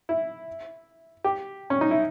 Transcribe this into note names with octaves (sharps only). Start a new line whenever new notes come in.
E4
G4
C#4
D#4
E4